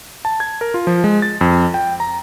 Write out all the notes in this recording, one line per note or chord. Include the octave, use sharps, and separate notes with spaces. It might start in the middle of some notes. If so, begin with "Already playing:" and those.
A5
G#6
A#4
F4
F3
G#3
A6
F2
G5
A#5